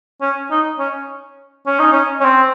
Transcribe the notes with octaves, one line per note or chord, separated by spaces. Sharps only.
C#4
D#4
C#4
C#4
D#4
C#4
C#4
C4